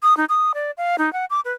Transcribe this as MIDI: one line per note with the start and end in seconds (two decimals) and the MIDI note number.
0.03 0.16 87
0.17 0.25 63
0.29 0.52 87
0.54 0.71 74
0.77 0.96 77
0.98 1.12 63
1.13 1.25 78
1.30 1.40 86
1.45 1.53 71